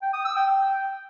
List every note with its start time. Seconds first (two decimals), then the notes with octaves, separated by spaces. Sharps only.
0.02 G5
0.14 D#6
0.25 E6
0.36 G5